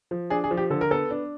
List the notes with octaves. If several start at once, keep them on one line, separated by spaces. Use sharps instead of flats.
F3
D4 G#4
G#4
F3
G4
D3 A4
A#4
B3 A4
D4